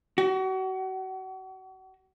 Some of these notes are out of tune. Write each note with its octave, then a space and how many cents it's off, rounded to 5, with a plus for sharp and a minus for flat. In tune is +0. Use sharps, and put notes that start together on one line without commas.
F#4 +35